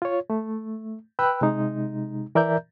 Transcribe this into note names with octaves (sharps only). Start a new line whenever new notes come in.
F4 C#5
A3
B4 G5 B5 E6 F#6
C3 G#3 D#4
E3 A#4 D5 E5 A#5 G6